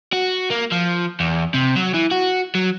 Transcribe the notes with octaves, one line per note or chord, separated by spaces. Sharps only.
F#4
A#3
F3
E2
C3
F#3
E3
F#4
F#3